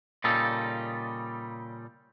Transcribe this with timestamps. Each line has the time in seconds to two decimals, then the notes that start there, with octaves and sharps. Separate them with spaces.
0.24 A#2 C#3 G3 D#4 A4